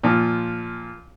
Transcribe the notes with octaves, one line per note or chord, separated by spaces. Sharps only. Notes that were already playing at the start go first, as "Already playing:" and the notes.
A#2 F3